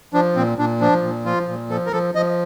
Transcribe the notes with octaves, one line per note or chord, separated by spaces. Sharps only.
F3 D4
A#2 C4
A#2 D4
F3 D4
A#2
F3 F4
A#2
F3 A4
A#4
F3 A4
F3 D#5